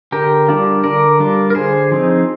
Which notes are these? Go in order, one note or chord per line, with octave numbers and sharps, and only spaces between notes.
D3 G4 A#4
G3 D4 F4
D3 A#4 D5
G3 D4 F4
A#4
D3 G#4 C5
F3 C4 D#4